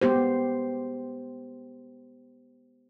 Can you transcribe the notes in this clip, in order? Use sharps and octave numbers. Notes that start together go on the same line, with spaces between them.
G#3 B3 G4 C5